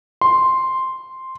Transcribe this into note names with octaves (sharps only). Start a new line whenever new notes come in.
C6